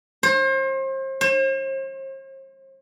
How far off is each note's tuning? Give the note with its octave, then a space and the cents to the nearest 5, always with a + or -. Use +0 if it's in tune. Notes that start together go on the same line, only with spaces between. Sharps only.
C5 +35
C5 +45